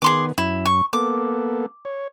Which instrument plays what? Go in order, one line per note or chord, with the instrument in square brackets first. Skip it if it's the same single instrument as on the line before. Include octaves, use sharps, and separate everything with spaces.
[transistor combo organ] D#3 B3 [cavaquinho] G#4 C6 D6
[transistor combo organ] F#2 [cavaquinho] E4
[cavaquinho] C#6
[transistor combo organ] A#3 B3 A4 [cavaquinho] D6
[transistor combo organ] C#5